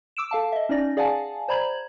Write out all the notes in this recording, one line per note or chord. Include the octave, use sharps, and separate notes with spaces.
D6 E6 D7 E7
A4 F5 A5
D#5 E5
C#4 D#4 D5 A#6
G#4 D5 F5 F#5 G#5 A5
C5 D5 A#5 B5 G#6 F#7